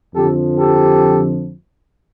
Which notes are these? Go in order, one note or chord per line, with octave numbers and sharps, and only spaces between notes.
F2 D3 F3 G4 A4
G4 A4